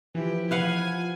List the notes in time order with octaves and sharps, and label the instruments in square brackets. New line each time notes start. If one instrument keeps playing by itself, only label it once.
[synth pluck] E3 [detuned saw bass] F3 [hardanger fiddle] E4 G4
[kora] B4 F5 F#5 [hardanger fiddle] G#5